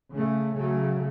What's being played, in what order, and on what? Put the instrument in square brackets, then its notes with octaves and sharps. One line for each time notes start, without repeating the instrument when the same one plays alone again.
[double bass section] C#3 A3
C#3 F#3 A3